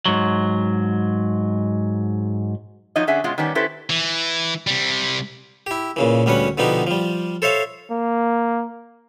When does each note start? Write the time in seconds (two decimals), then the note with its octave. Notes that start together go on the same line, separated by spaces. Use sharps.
0.06 G#2 F#3
2.96 F3 F#3 D#4 C#5 D#5
3.07 D3 C#4 D4 G#4 E5 F#5
3.24 B2 G#3 C#4 F4
3.38 D#3 G3 B3 C#4 D5
3.55 C#4 E4 G4 A4 B4 C5
3.90 E3
4.67 C3 G3
5.67 E4 G4
5.96 A#2 C#3 E3
6.26 D2 G3 C#4 B4 F#5
6.58 B2 D3 F3 B3 D#4 G4
6.87 F3 G3
7.42 A4 C5 C#5 E5 F5
7.90 A#3